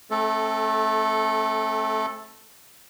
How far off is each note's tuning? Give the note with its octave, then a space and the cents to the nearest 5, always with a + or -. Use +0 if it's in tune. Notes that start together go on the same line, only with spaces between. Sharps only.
A3 -20 C4 +40 A4 +0